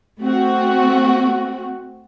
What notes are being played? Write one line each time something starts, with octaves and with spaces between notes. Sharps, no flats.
A3 C4 F#4